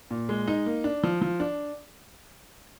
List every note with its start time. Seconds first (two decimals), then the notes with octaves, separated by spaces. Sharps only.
0.11 A#2
0.29 G#3
0.48 D#4
0.66 A#3
0.84 D4
1.03 F3
1.22 F3
1.40 D4